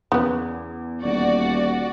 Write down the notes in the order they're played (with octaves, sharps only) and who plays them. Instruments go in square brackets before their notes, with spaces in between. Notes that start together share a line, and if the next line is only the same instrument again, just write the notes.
[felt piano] E2 [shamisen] C#3 B3
[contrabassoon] D#1 [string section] F#4 D5